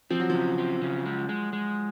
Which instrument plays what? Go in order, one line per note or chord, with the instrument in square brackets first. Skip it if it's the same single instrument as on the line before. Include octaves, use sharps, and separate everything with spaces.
[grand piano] F3 [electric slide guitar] C4
[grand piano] F#3
[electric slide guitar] C#3 [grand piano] F3
[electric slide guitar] C4
C#3
G#3
G#3
G#3